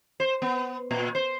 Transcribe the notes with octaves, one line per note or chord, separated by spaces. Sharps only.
C5
B3
A#2
C5